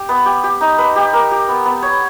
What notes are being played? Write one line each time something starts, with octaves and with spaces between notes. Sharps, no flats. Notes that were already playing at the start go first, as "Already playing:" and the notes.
Already playing: G4
B3
G4
G4
D#4
B4
G4
A#4
G4
B3
B3
C#5